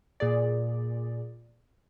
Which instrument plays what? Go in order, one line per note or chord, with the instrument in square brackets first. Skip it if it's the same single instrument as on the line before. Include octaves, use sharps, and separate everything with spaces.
[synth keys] A#2 G#4 D5